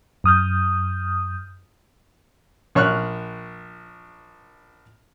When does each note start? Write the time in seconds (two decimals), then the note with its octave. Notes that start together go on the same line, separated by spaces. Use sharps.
0.24 F#2 D#6 F6 G6
2.75 A#1 C#5 C#6 F6 F#6